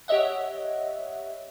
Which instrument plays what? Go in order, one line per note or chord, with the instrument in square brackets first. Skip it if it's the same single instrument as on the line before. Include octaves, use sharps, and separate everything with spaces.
[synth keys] G4 C#5 D#5 E5 F#5